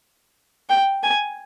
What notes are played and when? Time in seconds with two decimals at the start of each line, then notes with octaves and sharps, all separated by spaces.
0.69 G5
1.03 G#5